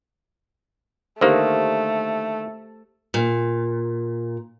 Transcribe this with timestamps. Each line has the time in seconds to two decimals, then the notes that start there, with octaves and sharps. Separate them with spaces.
1.21 D3 D#3 A3 A#3 G4 C5
3.14 A#2